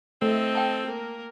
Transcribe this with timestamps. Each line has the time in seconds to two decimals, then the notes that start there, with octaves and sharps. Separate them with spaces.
0.22 A3 C4 A4 D#5
0.55 G5 A5
0.86 A#3 A#4